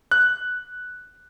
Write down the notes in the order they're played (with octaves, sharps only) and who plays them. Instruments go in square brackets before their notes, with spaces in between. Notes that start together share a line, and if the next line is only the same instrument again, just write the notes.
[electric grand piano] F#6